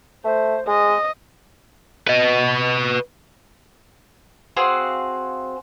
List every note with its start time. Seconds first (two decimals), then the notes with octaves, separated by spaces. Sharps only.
0.25 A3 C5
0.67 G#3 D#5
2.08 B4 D#5
4.57 C4 F#4 G#4 F5